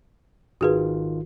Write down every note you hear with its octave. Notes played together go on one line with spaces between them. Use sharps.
G#1 D#3 F4 F#4 G#4 B4